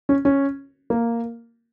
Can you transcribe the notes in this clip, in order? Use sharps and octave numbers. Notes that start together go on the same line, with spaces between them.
C#4
C#4
A#3